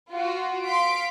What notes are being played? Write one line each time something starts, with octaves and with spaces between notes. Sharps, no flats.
F4 F#4
F5 C6 B6 D7